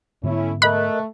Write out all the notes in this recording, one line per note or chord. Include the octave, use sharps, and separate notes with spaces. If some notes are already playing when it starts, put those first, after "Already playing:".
G#2 D3 A3 B3 C#4 E4
A3 A#4 D#5 B5 F#6